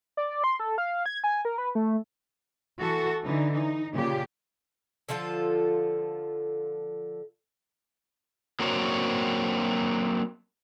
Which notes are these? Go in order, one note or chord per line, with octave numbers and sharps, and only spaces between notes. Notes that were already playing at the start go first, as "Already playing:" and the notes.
D5
C6
A4
F5
G#6
G#5
A#4
B4
A3
E3 F#4 A4
D3 E3 D#4
D#4
A#2 C#3 G4
D3 F3 F4 A4
F#3 A#3 C4 D4 F#4 C#5